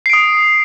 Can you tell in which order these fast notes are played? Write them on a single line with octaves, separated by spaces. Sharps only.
C7 D7 D#6